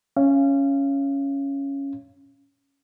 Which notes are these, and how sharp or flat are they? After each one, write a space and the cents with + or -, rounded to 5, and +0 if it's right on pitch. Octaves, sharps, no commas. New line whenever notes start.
C#4 +0 F5 -25